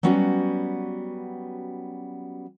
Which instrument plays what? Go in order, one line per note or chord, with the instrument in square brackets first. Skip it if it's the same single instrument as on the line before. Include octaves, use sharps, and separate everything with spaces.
[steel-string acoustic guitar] F#3 G3 B3 C#4 F#4